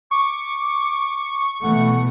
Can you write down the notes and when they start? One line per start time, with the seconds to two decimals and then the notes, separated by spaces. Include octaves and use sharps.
0.11 C#6 D6
1.63 B2 E3 A3 F#5